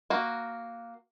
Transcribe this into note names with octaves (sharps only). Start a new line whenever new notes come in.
A#3 F#4